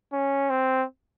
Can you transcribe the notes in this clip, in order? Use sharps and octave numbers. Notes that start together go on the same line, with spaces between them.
C#4
C4